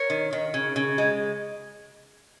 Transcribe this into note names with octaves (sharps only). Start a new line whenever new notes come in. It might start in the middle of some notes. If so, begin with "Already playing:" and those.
Already playing: A#4 C#5
D#3
D#3
C#3
C#3
G#3